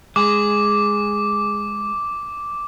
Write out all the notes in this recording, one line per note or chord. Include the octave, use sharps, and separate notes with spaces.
G#3 G#4 D6